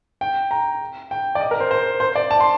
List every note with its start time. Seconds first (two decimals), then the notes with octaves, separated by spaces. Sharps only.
0.21 G5
0.51 A#5
1.11 G5
1.35 D5
1.40 D#5
1.51 A#4
1.60 C5
1.71 C5
2.00 C5
2.15 D5
2.31 A5
2.40 C6